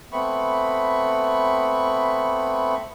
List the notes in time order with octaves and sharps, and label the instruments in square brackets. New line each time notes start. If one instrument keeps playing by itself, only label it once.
[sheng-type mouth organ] A3 B3 C4 B5 C#6